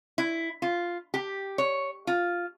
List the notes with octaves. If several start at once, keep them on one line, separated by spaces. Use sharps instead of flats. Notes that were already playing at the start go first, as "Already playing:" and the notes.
E4
F4
G4
C#5
F4